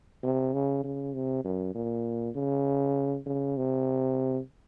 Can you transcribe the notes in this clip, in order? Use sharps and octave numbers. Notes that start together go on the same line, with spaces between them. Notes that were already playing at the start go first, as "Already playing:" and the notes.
C3
C#3
C#3
C3
F#2
A#2
C#3
C#3
C3